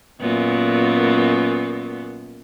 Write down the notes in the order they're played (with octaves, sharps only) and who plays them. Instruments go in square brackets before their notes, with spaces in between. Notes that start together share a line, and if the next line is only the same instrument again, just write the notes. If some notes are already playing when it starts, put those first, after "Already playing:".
[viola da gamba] F#2 A#2 B3